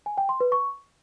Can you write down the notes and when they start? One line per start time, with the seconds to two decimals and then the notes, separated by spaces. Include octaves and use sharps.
0.06 G#5
0.18 G5
0.29 C6
0.40 B4
0.52 C#6